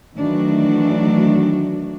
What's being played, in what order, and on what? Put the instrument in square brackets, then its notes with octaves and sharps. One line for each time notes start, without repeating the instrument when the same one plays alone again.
[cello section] D#3 E3 F#3 A3 D4 F#4